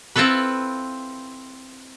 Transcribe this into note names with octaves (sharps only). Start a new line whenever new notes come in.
C4 E4 F4 A4 B4